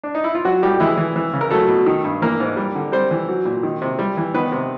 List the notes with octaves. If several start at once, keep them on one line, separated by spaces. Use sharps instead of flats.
D4
D#4
E4
F4
F#3 F#4
A2 G3 G4
E3 G#3 E4
E3
E3
C#3
A#4
F#3 A3 A4
B2
D#3
G2
E3 A#3 A#4
G#2
G3
D3
G3 C4 C5
E3
F#3
A#2
D#3
C3
G3
E3
D#3 B3 B4
C3